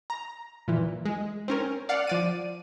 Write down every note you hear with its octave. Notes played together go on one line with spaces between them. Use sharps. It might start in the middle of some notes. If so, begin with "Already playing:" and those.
A#5
A#2 E3
G#3
C4 C#4 A#4
D5 F5 F#5
F3 D5 D#7